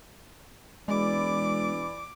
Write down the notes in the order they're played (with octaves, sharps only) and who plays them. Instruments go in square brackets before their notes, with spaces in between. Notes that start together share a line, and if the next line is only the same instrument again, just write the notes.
[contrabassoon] E1 [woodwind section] E3 E4 D5 [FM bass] G#3 [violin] D6